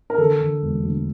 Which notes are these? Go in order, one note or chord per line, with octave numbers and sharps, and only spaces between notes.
A#4
D3 A4
D3
E1
D2